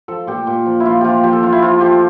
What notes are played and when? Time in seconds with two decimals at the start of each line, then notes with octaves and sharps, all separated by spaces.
0.08 F3 A4
0.27 A#2 G4
0.47 A#2
0.66 F3
0.80 E4
0.85 F3 F4
1.01 F3 F4 G4
1.24 F3 G4
1.33 A4
1.43 F3 F4
1.52 E4
1.62 F3 F4
1.81 F3 G4